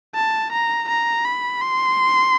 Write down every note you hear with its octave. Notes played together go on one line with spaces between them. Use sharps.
A5
A#5
A#5
B5
C6